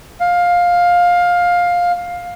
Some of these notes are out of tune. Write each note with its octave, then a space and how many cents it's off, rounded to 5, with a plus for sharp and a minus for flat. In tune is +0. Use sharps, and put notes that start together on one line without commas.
F5 +15